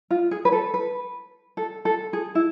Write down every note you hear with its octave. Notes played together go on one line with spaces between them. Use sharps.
F4
G#4
B4
A4
B4
A4
A4
G#4
E4